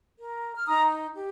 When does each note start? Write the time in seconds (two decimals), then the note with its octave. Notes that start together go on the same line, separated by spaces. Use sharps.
0.20 A#4
0.57 F6
0.66 D#4 A#5 D#6
1.14 G4